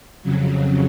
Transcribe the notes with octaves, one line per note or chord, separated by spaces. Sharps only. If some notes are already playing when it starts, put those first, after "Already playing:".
F2 C#3 F#3